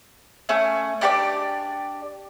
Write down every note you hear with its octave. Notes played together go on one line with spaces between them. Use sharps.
A3 C#4
D4 G4 B4 D5